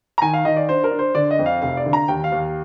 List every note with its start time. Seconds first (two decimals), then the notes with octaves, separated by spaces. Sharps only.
0.18 A#5
0.22 D#3 G#5
0.34 F5
0.45 D#3 D#5
0.56 D5
0.68 D4 C5
0.84 A#4
0.91 D4
0.99 C5
1.15 D3 D5
1.31 D#5
1.39 F2
1.46 F5
1.62 F1 F5
1.77 D5
1.86 D3
1.93 A#5
2.08 D#2 G5
2.24 F5
2.32 D#2